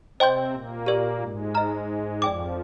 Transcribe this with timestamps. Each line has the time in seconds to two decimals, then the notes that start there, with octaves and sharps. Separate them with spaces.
0.20 C3 C4 C5 D#5 G5 C6 G6
0.53 A#2 A#3
0.86 G4 A#4 D5
1.20 G#2 G#3
1.55 D#5 A#5 F6
2.21 F2 F3 D5 G5 D6